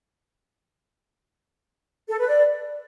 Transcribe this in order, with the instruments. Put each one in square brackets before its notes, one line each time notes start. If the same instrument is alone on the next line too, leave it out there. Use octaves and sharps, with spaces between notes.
[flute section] A4
B4
D5